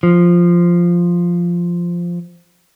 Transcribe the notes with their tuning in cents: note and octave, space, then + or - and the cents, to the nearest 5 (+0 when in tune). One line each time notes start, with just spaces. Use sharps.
F3 -5